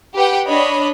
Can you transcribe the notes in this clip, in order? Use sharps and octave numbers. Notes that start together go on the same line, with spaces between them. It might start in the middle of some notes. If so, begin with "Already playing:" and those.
G4 B4 F#5 G5
D4 C#5 D#5 B5